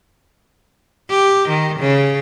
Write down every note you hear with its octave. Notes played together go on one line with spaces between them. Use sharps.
G4
D#3
C#3